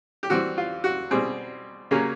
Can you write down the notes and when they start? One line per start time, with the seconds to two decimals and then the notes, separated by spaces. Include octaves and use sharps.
0.23 G4
0.30 E3 G3 C4 F#4
0.57 F4
0.84 F#4
1.11 B2 G3 C4 G#4
1.91 C#3 F#3 A#3 C#4